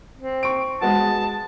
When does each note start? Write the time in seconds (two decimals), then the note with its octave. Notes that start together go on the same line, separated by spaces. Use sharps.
0.17 C4
0.43 C#6 D7
0.81 G#3 B3 F#4 A5